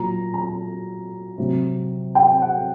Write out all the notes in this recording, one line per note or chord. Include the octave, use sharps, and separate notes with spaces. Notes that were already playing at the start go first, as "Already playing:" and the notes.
Already playing: A#2 F#3 A#5
A#5
C3 F#3
G5
F#5